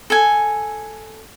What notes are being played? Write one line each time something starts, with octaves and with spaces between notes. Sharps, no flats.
A4 G#5